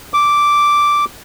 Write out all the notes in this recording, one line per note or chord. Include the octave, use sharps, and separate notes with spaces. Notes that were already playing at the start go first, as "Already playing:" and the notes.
D6